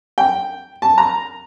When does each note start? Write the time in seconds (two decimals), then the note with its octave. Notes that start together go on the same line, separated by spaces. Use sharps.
0.18 G5
0.82 A5
0.98 A#5